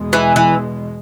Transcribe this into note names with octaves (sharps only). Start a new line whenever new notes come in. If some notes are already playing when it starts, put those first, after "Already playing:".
Already playing: E2 B2 G#3
E3
E3